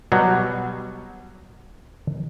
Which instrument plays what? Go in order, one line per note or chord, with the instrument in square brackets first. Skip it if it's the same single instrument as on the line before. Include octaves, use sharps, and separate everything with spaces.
[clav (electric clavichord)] B2 F#3 G3